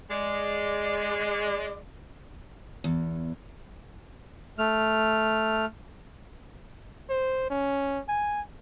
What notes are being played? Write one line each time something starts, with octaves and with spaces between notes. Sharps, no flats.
G#3 D5
E2
A3 F6
C5
C#4
G#5